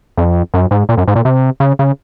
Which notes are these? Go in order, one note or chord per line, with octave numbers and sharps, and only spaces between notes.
F2
F#2
G#2
A#2
F#2
G#2
A#2
C3
C#3
C#3